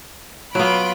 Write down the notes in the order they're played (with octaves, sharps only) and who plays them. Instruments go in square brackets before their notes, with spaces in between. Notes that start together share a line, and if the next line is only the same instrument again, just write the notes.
[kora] F#3 B3 [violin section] F4 B5 D7